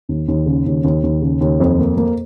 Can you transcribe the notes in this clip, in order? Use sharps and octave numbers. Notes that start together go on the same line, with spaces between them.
D#2
D#2
C#3
D#2
D#2
D#2
C#3
D#2
F2
A#3
A#3